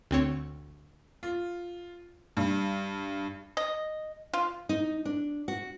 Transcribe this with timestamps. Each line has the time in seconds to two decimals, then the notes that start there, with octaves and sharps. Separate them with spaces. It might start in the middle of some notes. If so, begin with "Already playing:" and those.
0.11 D2 C4 C#5
1.23 F4
2.37 G2
3.57 D#5
4.33 F4
4.69 D#4
5.05 D4
5.48 F#4